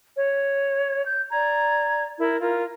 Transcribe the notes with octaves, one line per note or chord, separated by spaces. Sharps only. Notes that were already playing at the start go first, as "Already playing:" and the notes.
C#5
G6
D5 A#5 G#6
E4 A#4
F4 A#4